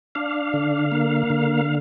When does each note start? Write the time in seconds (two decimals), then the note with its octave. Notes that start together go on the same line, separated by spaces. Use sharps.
0.15 D4 F5
0.54 D3
0.92 A#3
1.30 D3